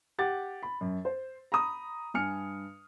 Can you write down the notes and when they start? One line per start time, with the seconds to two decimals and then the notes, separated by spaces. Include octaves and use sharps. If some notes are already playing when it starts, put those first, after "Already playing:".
0.18 G4 F#5 A6
0.63 B5
0.81 F#2
1.05 C5
1.52 A#5 B5 D#6
2.14 G2 G#5 F6 C#7